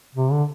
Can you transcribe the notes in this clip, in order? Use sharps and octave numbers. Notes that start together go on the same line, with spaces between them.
C3
D3